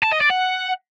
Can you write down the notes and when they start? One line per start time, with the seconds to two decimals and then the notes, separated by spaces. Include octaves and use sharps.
0.03 A5
0.12 D#5
0.21 D5
0.30 F#5